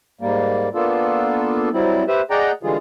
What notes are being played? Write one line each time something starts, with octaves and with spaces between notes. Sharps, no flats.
G#2 G3 A#3
A#3 B3 D4 F4 A4
F#3 G3 C4 E4
G4 B4 C5 E5
G#4 D5 D#5 F#5 G5 A#5
D3 E3 G3 G#3 F4 G#4